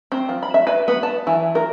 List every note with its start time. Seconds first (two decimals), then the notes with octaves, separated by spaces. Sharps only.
0.12 C4
0.29 F3
0.43 B5
0.54 E5
0.67 B4
0.88 B3
1.03 A5
1.27 E3
1.55 A#4